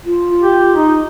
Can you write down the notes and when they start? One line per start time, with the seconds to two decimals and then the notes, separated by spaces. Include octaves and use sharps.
0.06 F4
0.42 G4
0.73 D#4